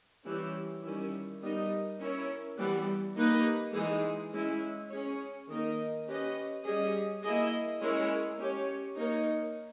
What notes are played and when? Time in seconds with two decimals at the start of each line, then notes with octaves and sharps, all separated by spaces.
0.25 E3 G3 C#4 E4 G4
0.83 D#3 G3 C#4 E4
1.42 G3 B3 D#4 A#4 D#5
2.00 C#4 E4 A#4 C#5
2.58 E3 G3 B3
3.16 A#3 D#4 G4 B4 D#5
3.74 E3 G#3 D#4 G#4
4.32 G#3 C#4 E4
4.90 C#4 G#4 C#5
5.48 D#3 A#3 D#4 A#4 D#5
6.07 C#4 G4 B4 D#5
6.64 G3 C#4 G#4 D#5
7.22 A#3 E4 G#4 D#5
7.81 G#3 C#4 E4 A#4 C#5
8.39 C#4 G4 C#5
8.97 A#3 D#4 A#4 C#5